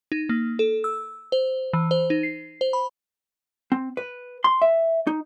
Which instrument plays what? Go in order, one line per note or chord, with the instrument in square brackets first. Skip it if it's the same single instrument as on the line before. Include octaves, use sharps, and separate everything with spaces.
[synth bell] D#4
A#3
A4
E6
C5
E3
C5
D#4
C7
C5
B5
[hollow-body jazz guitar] C4
B4
C6
E5
D#4